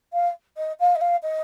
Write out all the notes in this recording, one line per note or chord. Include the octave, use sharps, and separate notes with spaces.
F5
D#5
F5
D#5
F5
D#5